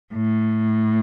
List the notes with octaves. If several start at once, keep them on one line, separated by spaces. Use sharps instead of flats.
A2